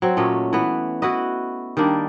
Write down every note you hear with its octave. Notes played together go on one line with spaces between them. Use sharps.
F#3 C4
A#2 A3 C#4 D#5
E3 B3
E4 F#4 B4 D#5
D#3 G3 A#3 D4